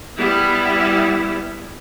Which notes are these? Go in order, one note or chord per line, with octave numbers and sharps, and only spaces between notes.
G3 B3 E4